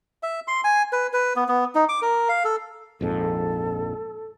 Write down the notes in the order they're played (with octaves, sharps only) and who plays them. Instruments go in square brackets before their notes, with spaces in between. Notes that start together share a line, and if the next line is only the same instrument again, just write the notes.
[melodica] E5
C6
G#5
B4
B4
B3
B3
D#4
D6
A#4
F5
A4
[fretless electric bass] A#1 F2 G#2 [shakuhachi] A4